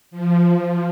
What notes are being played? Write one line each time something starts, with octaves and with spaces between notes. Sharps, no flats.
F3